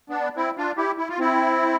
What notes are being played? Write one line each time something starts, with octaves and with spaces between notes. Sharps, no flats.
B3 D4
C4 E4
D4 F4
E4 G4
E4
F4
C4 E4